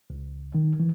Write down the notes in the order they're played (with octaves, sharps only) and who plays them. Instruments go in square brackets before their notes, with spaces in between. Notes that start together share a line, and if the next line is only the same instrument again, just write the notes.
[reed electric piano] C#2
D#3
E3